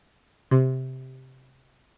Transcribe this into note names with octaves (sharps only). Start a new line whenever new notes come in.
C3